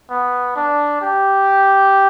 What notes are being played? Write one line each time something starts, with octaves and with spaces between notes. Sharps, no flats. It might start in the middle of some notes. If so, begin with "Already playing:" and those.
B3
D4
G4